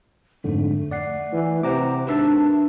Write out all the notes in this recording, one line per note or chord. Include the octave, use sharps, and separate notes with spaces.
F2 G#2 D3 A3
D5 F#5 C7
E3
C3 C5 F#5 A#5 D6
G#1 D4 B4 E5 A5